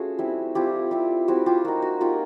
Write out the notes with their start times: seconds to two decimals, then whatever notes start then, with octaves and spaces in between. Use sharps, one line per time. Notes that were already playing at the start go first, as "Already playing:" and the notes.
Already playing: A3 C#4 F4 F#4 G#4
0.19 G3 C4 E4
0.55 G3 C4 E4 F4 G4
0.91 G3 C4 E4
1.28 G3 C4 E4 F#4
1.46 F4 G4
1.65 A#3 D#4 F#4
1.82 F#4
2.01 A#3 D#4 F4 G4